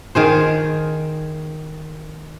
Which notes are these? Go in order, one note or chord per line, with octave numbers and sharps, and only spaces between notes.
D#3 G#4 C5